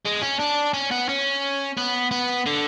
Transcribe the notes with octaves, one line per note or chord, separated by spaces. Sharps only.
G#3
C#4
D4
C#4
B3
C#4
B3
B3
D3